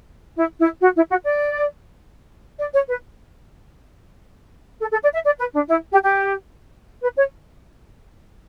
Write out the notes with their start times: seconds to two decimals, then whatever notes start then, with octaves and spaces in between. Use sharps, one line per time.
0.37 E4
0.59 E4
0.81 F#4
0.96 E4
1.10 F#4
1.25 D5
2.58 D5
2.73 C#5
2.88 B4
4.81 A4
4.91 A4
5.03 D5
5.14 E5
5.25 D5
5.39 B4
5.54 D4
5.69 E4
5.91 G4
6.03 G4
7.02 B4
7.17 C#5